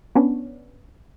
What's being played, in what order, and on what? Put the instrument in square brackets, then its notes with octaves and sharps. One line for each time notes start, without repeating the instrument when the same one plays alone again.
[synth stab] B3 C#4 D4